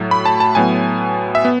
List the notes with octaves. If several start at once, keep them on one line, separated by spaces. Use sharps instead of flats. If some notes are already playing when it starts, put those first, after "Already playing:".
Already playing: A2 F#3 A3
B5
A5
A5
A2 F#3 B3 G#5
E5
B3